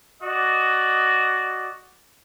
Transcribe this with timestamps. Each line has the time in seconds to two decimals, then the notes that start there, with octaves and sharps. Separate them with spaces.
0.22 F#4 D5 D#5